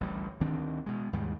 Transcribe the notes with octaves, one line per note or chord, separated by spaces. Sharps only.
A1 D2 G3
D2 D#3 C4 D4
B2 G#3
D#2 G#2 C#3 G3